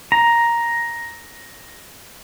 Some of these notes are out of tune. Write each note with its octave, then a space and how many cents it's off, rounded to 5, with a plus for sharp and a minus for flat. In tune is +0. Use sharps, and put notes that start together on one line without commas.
A#5 +5